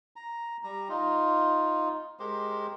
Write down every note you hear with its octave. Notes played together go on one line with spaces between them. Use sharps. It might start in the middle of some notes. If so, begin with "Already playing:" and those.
A#5
G3 A#5
D#4 F4
G#3 G4 A#4 C5